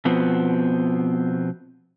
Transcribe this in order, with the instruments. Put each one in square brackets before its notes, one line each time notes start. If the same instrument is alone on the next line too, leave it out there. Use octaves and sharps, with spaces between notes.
[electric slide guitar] B2 F3 B3 C4